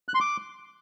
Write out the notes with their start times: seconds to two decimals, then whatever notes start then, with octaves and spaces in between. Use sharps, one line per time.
0.09 F#6
0.15 C6
0.21 D6